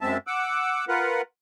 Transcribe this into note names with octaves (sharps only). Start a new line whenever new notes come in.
F#2 G#3 C4 E5 A5
F#5 D6 E6
F4 A#4 B4 F#5